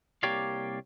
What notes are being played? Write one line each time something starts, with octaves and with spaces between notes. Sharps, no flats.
C2 A#3 G4 C#5 D5 F5